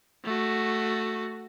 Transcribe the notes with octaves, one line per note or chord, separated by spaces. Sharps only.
A3 F#4